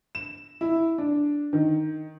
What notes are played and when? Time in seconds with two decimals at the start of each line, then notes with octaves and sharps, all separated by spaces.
0.15 E7
0.61 E4
0.98 D4
1.53 D#3